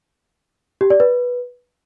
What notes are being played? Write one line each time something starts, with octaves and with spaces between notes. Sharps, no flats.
G4
D5
B4